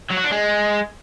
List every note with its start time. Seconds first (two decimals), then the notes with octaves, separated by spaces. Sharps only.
0.10 F#3
0.17 F#4
0.24 D4
0.31 G#3